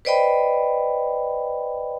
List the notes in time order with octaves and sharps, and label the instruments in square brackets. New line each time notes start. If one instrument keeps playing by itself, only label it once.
[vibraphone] B4 C5 D5 D#5 G5 B5